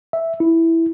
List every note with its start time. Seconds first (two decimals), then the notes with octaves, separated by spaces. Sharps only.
0.13 E5
0.40 E4